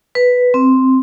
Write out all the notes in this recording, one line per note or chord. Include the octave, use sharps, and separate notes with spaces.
B4
C4